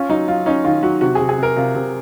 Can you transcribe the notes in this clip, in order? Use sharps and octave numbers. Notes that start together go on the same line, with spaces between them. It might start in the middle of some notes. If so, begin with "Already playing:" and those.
Already playing: C#4 F4
F#3 D#4
F#3 F4
C#4 D#4
D#3 F4
F#3 F#4
C3 F#4
C3 G#4
G#4
C3 A#4
C3 F4
C3